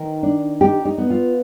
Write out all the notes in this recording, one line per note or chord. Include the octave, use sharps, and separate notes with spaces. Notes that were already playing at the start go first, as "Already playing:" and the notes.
Already playing: D#3 D#4
D4
D#4 G4
D#4
B3
F4